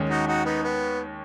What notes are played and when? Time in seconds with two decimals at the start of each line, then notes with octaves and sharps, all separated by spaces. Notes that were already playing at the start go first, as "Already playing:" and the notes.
Already playing: D#2 D#3 G#3 C#4
0.09 D#4 F#4
0.27 D#4 F#4
0.45 B3 D#4
0.63 B3